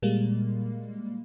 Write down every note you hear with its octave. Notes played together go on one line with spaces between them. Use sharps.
A#2 G3 G#3 A#3